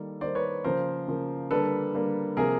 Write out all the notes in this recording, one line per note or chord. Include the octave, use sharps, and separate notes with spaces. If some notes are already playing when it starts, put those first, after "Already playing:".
Already playing: D#3 G3 A#3 A4
D#3 G3 A#3 C5 D5
B4 C#5
C#3 F3 A#3 A#4 C5
C#3 F3 A#3
D3 G3 A#3 A4 B4
D3 G3 A#3
C3 F3 A#3 G#4 A#4